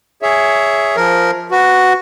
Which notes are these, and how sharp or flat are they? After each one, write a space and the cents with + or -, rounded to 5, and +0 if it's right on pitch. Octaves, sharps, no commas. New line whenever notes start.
G#4 +0 C#5 +15 E5 +0
F3 +0 A#4 +0
F#4 +0 B4 +15